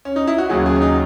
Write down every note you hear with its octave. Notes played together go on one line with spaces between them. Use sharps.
C#4
D#4
E4
F#4
D#2 C#3 F#3 G#4
G#4
C#4
D#4